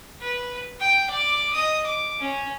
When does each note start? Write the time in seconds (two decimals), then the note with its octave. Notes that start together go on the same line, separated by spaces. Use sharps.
0.21 B4
0.80 G5
1.10 D5 D6
1.53 D#5 D#6
1.86 D6
2.20 C#4